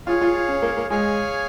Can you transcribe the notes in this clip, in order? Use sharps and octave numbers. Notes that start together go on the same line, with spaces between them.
F4 G#4 C#5 F5
F4
F4
C#4
A#3
A#3
G#3 G#4 C#5 F5 G#5